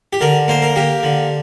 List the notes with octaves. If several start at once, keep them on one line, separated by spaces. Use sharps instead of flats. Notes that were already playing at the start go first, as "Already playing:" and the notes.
G4
D3 A#4
A#3 C5
A#4
A#3 G4
D3